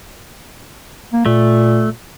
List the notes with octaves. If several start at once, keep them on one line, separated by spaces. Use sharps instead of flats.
A#3
A#2 A3